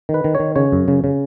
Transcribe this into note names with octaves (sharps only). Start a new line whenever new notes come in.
D#3
B4
D#3
D#3 C#5
C#3 C#5
F#2
C#3
C#3